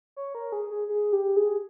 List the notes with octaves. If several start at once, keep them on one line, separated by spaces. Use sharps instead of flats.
C#5
A#4
G#4
G#4
G#4
G4
G#4